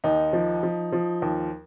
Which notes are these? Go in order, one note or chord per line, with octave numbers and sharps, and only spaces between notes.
D#2 D#4
F3
F3
F3
D#2